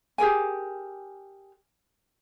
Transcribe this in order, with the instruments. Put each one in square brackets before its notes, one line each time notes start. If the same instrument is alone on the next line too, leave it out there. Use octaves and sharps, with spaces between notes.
[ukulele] G4 G#4 A#4 G#5